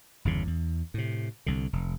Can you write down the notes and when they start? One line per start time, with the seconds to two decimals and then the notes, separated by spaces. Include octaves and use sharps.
0.25 G1 E2 C#3
0.47 E2
0.94 A2 C3
1.46 C2 D3
1.73 F1